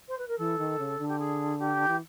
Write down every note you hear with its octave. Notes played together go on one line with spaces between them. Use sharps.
C5
B4
A#4
E3 A4
D#3
C#3
D3
G4
G#4
G4
E3